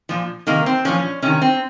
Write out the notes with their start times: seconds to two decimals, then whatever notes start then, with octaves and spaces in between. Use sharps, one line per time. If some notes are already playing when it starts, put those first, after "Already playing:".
0.09 A#2 F3
0.47 C3 D#3 A#3
0.66 C4
0.85 A#2 F3 C#4
1.22 C3 D#3 C#4
1.42 C4